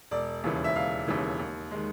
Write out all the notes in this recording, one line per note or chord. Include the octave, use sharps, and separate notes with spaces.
E1 D5
D#2 C#3 E3
E5
E1 F5
D#2 C#3 E3
D#2
D#3 G#3